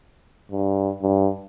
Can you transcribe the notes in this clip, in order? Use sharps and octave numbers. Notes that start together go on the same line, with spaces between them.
G2
G2